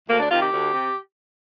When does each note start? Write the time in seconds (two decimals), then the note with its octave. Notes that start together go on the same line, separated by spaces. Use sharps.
0.09 D2 A#3
0.19 D4
0.29 C3 D#3 F4
0.40 G4
0.51 D2
0.72 C3